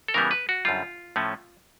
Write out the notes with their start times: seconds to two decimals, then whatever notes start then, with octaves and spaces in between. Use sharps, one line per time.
0.08 A4
0.14 C#3 E3 G3 B3 A#4
0.31 B4
0.49 F#4
0.65 F#2 D3 G3 F4
1.16 A2 F3 A3 C#4